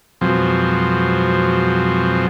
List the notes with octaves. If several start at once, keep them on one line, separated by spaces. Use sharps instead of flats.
F2 B2 F3 F#3 G#3 C4